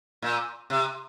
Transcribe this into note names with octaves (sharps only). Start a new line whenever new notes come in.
A#2
C3